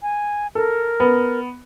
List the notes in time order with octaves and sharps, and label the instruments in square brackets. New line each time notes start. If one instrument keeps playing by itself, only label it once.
[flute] G#5
[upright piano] A4 [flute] A#4
[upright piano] B3